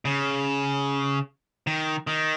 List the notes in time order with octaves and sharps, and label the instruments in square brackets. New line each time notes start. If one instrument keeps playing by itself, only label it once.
[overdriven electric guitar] C#3
D#3
D#3